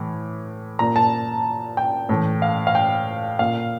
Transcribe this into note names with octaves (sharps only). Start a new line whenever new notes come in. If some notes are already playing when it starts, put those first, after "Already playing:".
Already playing: A2 E3
A#2 A#5
A5
G5
A2 E3
F5
F5
G5
A#2 F5